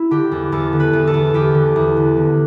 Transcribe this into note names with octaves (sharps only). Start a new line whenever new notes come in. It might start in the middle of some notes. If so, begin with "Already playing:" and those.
Already playing: E4
D3 G4
E2
E2 A4
D3
B4
E2
A4
E2
E2 G4
D3
E2
D3
D3